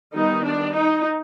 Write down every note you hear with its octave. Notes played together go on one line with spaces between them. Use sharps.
D#3 G3 B3 D#4
D4
D#4